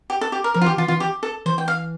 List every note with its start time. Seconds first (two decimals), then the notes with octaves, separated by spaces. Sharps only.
0.10 G4
0.21 A4
0.32 G4
0.44 A#4
0.54 F3 A#4
0.61 F4
0.66 E3 G4
0.78 E3 F4
0.88 E3 F4
1.00 G4
1.23 A4
1.46 E3 C5
1.58 G5
1.68 F5